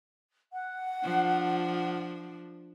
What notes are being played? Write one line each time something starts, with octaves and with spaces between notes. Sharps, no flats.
F#5
F3 D4